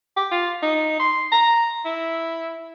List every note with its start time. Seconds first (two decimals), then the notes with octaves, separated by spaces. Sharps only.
0.16 G4
0.31 F4
0.62 D#4
1.00 C6
1.32 A#5
1.85 E4